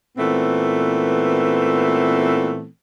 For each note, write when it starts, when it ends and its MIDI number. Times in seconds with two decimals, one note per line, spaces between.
0.17 2.67 46
0.17 2.67 52
0.17 2.67 57
0.17 2.67 59
0.17 2.67 60